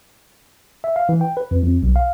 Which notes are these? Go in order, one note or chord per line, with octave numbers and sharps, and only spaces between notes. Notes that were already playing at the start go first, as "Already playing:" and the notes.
E5
F5
E3
G5
B4
F2
F2
B1
F5